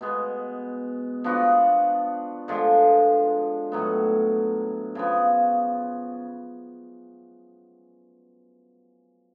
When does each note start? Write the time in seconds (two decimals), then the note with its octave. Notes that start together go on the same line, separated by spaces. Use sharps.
0.01 B2 G#3 B3
1.24 F3 B3 D4 F#4
2.48 D3 F3 G#3
3.72 A2 F#3 B3
4.95 C#3 F3 B3